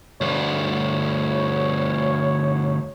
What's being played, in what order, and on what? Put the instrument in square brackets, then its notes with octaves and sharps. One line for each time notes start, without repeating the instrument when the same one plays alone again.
[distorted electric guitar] D2 G2 [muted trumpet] C#5